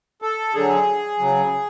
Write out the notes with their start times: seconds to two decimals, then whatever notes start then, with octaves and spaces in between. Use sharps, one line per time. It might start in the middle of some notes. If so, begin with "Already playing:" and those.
0.22 A4
0.53 D3 F#3 G#4
1.19 C#3 F#3